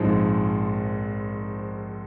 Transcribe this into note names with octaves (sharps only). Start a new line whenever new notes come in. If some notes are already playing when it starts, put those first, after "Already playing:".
Already playing: A#1 G#2 F3 G#3 C4